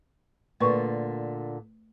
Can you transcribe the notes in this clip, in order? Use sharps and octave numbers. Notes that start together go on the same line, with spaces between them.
A#2 D3 A3 B4 C#6